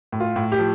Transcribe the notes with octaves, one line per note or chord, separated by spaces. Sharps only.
A2
F4
A2
G4
F3